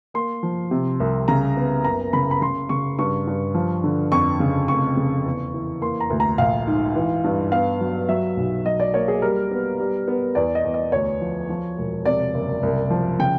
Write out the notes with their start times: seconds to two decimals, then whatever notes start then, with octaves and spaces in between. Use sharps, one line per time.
0.14 A#3 C6
0.43 F3
0.71 C3
1.00 C2
1.28 C#3 A#5
1.57 B3
1.84 F#1 A#5
2.13 C#3 B5
2.31 B5
2.42 C#3 C6
2.69 C#3 C#6
2.99 G2 C#6
3.27 G2
3.54 F3
3.84 D3
4.12 F2 C#6
4.40 C#3
4.68 F1 C#6
4.97 C#3
5.25 E2
5.54 E3
5.81 A#3 C6
6.00 A#5
6.10 D2
6.20 A#5
6.38 A#1 F5
6.67 G#2
6.95 E3
7.24 G2
7.52 B3 F5
7.81 F#3
8.09 F#3 E5
8.37 B1
8.66 F#3 D#5
8.80 D5
8.94 A#3 C#5
9.08 G#4
9.22 G3 A#4
9.51 B3
9.79 G3
10.08 B3
10.35 E2 D5
10.55 D#5
10.64 E2
10.74 D#5
10.92 D2 C#5
11.21 F3
11.49 F3
11.78 E1
12.05 C3 D5
12.34 F#1
12.63 C2
12.90 F3
13.19 C#3 G5